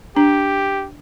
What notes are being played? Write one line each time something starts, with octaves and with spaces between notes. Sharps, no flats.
D4 G4